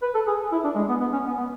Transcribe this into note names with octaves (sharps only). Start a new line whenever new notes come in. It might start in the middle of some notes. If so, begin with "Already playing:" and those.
B4
A4
G#4
E4
D4
G#3
B3
B3
C#4
B3
B3